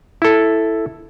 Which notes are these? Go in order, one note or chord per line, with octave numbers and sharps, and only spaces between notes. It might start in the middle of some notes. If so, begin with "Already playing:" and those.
E4 A4